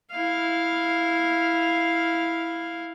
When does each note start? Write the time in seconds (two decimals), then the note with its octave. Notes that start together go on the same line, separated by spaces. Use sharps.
0.11 E4 F5